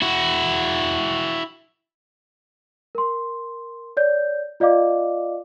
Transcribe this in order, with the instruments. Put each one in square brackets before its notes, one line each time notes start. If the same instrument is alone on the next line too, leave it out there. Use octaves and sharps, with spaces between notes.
[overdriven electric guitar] E4 F#4
[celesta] A#4 C6
C#5 D5 G6
F4 D5 D#5 F5 D6